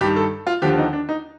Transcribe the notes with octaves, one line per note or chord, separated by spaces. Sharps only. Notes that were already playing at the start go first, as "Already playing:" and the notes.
G2 D#3 G4
A4
F4
D#2 D3 F3 G4
D#4
D4
D#4